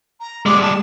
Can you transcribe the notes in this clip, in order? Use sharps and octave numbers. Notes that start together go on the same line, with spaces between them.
A#5
G3 G#3 D6
A5